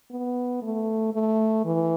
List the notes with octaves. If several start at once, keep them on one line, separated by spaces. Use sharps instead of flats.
B3
A3
A3
E3